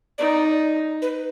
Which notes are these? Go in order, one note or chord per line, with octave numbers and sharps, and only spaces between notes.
D#4 D5
B4